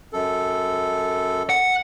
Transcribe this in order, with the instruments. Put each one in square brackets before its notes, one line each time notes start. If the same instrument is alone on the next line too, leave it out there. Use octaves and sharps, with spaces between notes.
[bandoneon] F#2 A4
[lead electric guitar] F#5